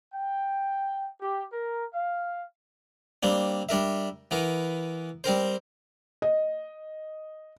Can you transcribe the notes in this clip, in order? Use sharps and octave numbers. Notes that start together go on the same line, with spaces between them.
G5
G4
A#4
F5
G3 A#3 C4 D4
G3 D4 A#4 E5
E3 B3 A#4
G3 C4 A#4 C5
D#5